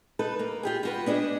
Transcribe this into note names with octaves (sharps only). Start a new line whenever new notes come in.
D#4 A4 B4
A#3
F4 G4 G#4
F4 F#4 B4
B3 D4 G#4 D#5